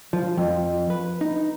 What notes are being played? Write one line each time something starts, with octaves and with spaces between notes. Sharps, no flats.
F3
F2
B4
D#4